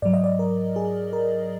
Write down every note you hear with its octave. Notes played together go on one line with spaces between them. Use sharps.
G#2 F#3 D5
D#5
D5
A#4
G#4
A#4